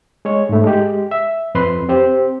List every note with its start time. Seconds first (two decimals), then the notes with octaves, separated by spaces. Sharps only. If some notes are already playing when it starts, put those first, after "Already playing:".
0.25 G#3 C#5
0.49 G#2 A3
0.64 G#3 G4
1.11 E5
1.55 F2 B4 C6
1.89 C4 G4 C5